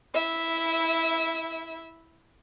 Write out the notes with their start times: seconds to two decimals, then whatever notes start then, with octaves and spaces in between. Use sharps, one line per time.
0.14 E4 E5